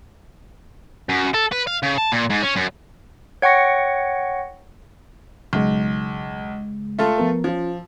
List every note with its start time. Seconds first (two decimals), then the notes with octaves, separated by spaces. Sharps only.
1.09 F#2
1.34 A4
1.52 B4
1.67 F5
1.83 C#3
1.98 A5
2.12 A#2
2.30 G#2
2.43 C#4
2.57 F#2
3.42 C#5 F#5 G5 C#6 A#6 C#7
5.53 B1 C#3 G#3
6.99 A3 F4 A4
7.18 F3 B3 A#4
7.44 F3 C#4 F4